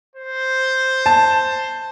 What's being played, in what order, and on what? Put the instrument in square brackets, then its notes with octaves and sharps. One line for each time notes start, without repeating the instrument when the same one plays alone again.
[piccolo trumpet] C5
[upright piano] A5